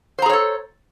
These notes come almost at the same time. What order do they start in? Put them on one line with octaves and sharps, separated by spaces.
C5 A#5 G#4 C#5 A4